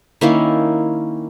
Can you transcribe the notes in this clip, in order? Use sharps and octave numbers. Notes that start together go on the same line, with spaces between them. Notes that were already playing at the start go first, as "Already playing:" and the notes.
D#3 A#3 C#4 E4